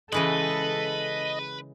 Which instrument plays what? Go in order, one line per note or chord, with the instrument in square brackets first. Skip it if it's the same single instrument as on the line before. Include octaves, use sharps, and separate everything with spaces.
[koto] C#3 E3 G#3 [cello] A4 [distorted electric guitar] B4 [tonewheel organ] D#5